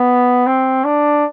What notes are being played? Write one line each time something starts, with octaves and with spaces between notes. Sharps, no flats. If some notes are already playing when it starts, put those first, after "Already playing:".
Already playing: B3
C4
D4